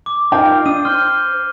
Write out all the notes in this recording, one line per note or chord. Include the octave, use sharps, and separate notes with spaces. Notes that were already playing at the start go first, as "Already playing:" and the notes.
D6
D#4 F4 A#4 G5
D4 D#6 D#7
C5 C6 F6 G6 G7